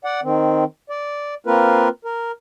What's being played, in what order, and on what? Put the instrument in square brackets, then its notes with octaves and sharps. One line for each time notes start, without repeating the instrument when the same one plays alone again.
[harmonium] D5 F#5
D#3 C4
D5
A#3 C4 F4 A#4 B4
A#4